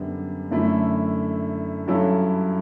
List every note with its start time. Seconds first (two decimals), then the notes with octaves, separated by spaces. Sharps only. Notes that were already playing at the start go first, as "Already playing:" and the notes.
Already playing: F#2 D3 G3 B3
0.51 F#2 D3 A3 E4
1.87 G2 F#3 C#4 E4 A4